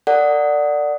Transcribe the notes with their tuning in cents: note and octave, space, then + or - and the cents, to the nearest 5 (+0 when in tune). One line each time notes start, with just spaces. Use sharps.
A#4 -40 D5 +0 F#5 +0